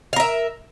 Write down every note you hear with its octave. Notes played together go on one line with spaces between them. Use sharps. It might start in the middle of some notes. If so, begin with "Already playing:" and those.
A#4 E5 F5